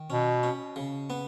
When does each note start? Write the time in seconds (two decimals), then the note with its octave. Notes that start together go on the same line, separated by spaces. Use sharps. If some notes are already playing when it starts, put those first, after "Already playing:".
Already playing: D#3
0.10 B2 C#4
0.43 C#4
0.76 C#3
1.10 B3